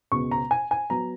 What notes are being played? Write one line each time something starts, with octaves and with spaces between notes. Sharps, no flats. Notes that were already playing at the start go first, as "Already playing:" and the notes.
C#2 B2 G#3 B3 C#6
A#5
G#5
G#5
F#3 B3 A#5